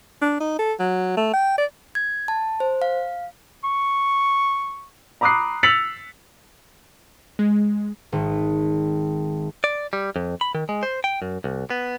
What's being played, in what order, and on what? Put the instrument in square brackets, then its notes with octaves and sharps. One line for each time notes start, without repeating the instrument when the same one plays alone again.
[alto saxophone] D4
D#4
A4
F#3
A3
G5
D5
[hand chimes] G#6
A5
C5
F5
[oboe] C#6
[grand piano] A#5 B5 D6 D#6 F#6 C7
E6 A6 B6 C#7 F7 F#7
[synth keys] G#3
[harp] G#1
[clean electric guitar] D5
G3
F2
B5
D#3
G#3
C5
G5
F#2
C2
B3